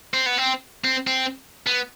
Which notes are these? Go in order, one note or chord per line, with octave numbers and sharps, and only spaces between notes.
C4
B3
C4
C4
C4
B3